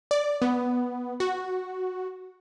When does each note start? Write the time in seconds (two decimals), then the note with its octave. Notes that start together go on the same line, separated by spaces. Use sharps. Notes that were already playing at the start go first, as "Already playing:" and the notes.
0.11 D5
0.42 B3
1.20 F#4